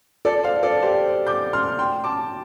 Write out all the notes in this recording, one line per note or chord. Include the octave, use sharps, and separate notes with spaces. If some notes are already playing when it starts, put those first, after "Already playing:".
A4 D5
C5 F5
A4 D5
G4 C5
D6 G6
C6 F6
G5 C6
A5 D6